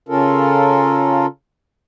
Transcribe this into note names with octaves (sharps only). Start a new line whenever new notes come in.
C#3 C#4 F4 A4 A#4